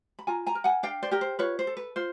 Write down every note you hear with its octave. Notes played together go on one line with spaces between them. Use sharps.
B5
F4 G#5 A#5
G#5 A#5
A#4
F#5 G#5
D4 F5 G5
C5 D5
G4 A#4
C5
F4 B4 C#5
C5
A4
B4
F4 C5